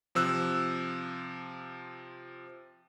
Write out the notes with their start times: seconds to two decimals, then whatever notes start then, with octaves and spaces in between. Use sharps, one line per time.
0.15 C3 F3 E6 F#6